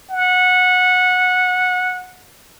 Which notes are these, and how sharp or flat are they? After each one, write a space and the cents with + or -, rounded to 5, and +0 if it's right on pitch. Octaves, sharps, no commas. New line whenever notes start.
F#5 -15